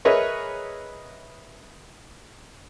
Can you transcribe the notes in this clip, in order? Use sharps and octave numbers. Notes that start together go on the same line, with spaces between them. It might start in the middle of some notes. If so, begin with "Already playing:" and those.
G#4 A#4 B4 C#5 D#5 E5